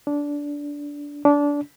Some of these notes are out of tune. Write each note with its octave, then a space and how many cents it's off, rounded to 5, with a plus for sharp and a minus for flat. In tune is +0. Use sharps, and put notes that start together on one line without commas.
D4 -15
D4 -20